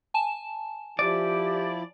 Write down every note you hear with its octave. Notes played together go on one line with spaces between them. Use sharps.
G#5 A5 E7
F3 E4 G4 D5